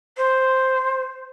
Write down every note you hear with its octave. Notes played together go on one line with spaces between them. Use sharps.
C5